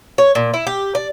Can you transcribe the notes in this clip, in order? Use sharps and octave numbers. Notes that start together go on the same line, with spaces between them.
C#5
A#2
E4
G4
D5